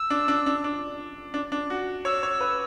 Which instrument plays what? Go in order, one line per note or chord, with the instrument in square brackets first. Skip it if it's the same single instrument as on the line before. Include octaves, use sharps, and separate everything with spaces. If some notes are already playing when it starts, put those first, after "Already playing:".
Already playing: [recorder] E6
[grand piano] D4
D4
D4
D4
D4
D4
F#4
[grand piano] C#5 [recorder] E6
[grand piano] C#5
B4